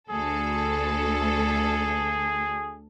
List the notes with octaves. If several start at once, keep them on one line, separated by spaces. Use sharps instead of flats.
D2 G#4 A4